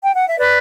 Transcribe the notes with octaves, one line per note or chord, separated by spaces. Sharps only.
G5
F#5
E5
B4 D5